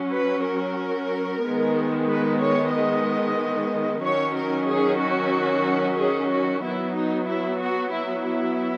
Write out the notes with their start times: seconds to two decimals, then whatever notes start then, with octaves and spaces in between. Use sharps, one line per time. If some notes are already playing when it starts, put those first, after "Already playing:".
Already playing: F#3 C#4
0.13 B4
0.45 A#4
1.43 D#3 G#3 B3
2.08 B4
2.41 C#5
2.73 D#5
4.03 D#3 F#3 C#4 C#5
4.36 A#4
4.68 G#4
5.00 F#4
5.98 G#4
6.31 F#4
6.63 F#3 B3 E4
6.95 D#4
7.28 E4
7.60 F#4
7.93 E4
8.25 E4